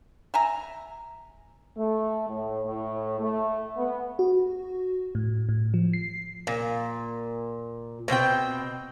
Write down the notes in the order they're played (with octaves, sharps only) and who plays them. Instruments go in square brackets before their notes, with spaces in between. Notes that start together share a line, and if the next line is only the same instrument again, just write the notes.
[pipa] E5 G#5 A#5
[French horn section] A3
A2
A2
A3
B3
[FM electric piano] F#4
A2
A2
F3
C7
[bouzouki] A#2
B2 C4 F4 G5